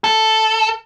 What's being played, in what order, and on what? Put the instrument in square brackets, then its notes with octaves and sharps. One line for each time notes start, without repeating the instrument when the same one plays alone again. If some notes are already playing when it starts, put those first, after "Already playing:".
[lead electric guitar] A4